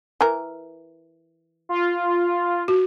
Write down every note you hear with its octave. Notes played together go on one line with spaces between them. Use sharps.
E3 A#4
F4
F#4